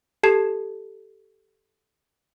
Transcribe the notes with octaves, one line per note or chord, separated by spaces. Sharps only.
G4 A4 A5 G#6 C7 E7